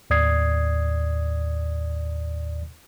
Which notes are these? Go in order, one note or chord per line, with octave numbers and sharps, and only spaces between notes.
D#2 A2 D5 D#6 G#6 C7